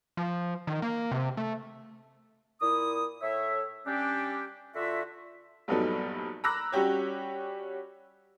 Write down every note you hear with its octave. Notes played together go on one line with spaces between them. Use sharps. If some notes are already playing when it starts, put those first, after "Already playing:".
F3
D#3
A#3
C3
A3
A#2 E4 D#6
A2 C#5 E5
G3 C#4 D4 G4
D3 F4 F#4 E5
A#1 G2 F#3 B3 D#4 A4
A#5 B5 D6 E6 F#6 A#6
G3 C#4 F#4 G4 C#5